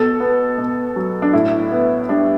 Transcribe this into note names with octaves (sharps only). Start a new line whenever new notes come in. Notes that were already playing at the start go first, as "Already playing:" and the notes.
Already playing: B2 A4
B3
B2
F#3
D4
A2 E4
B3
G3 D4